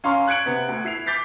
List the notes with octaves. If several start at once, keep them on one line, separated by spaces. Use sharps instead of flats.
C#4 F5 A#5 C6 C#6
F#6 G#6 C#7 D7 F#7
C3 B3
D2
E4 C7 F7
D6 G6 A6 B6 C7